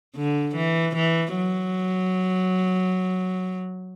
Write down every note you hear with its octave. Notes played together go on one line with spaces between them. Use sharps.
D3
E3
E3
F#3